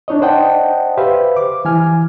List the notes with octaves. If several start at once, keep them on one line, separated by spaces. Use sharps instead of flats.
D4 D#4 C#5 D#5
C5 D5 D#5 F#5 G5 A5
G4 B4 C5 E5 F5
D6
E3 G#5 F6